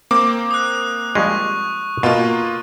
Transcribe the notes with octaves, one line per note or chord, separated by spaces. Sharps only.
A#3 C4 D6
D#6 F#6
F3 G3 G#3 C#6
B2 A#3 F4